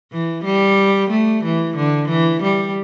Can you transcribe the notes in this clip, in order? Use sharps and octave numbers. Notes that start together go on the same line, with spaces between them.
E3
G3
A3
E3
D3
E3
G3